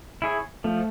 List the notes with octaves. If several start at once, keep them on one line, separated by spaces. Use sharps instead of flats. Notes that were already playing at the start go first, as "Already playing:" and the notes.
E4 G#4 C#5
F3 A3